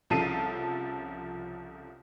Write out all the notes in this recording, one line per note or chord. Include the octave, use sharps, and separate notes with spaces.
C2 C#3 F3 A4 C7 D#7